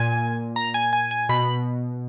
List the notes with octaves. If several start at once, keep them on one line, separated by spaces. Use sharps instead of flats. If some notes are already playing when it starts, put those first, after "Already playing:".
Already playing: A#2 G#5
A#5
G#5
G#5
G#5
B2 B5